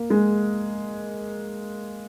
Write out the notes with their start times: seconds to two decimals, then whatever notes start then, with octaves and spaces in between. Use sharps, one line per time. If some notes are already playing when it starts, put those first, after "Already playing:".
Already playing: A#3
0.10 G#3